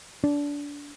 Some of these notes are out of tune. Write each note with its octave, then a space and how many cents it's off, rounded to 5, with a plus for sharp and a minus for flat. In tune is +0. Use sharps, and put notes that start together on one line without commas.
D4 -25